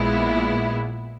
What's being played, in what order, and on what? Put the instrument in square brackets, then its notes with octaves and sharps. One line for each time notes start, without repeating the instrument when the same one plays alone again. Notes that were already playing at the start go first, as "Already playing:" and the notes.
Already playing: [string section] A#1 A#2 G#3 B3 E4